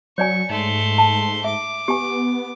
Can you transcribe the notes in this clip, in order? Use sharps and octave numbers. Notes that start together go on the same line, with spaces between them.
F#3 C#5 D5 G#5 C#6
G#2 A3 C6
A5
E5 D6
B3 G4 G#5